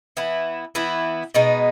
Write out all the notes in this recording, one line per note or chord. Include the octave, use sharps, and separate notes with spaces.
E3 B3 E4
E3 B3 E4
B2 G#3 B3 D#4